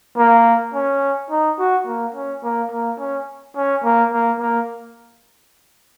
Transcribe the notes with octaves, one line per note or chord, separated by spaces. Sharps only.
A#3
C#4
D#4
F#4
A#3
C#4
A#3
A#3
C#4
C#4
A#3
A#3
A#3